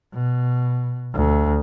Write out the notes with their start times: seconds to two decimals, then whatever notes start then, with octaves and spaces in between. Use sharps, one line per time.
0.14 B2
1.14 D2